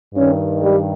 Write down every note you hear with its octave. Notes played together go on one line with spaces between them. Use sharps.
G2 D#3 C#4
G3